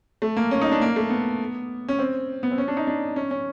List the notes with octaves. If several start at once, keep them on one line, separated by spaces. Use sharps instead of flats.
A3
A#3
C#4
D#4
D4
A#3
A3
B3
C#4
C4
B3
C4
C#4
D4
D#4
D4
C#4
C#4